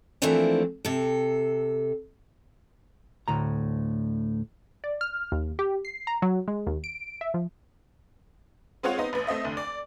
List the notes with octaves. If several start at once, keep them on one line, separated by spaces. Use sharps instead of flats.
E3 F3 A3 A#3 C4 D4
C3 A4
D2 A2 A#5
D5
F6
D#2
G4
C7
A#5
F#3
G#3
D#2
D7
E5
F3
G#3 C4 F4 G#4 C#5 F#5
B3 C4 D#4
A1 B4
A3 C4 D#5 E5
F1 D2
D5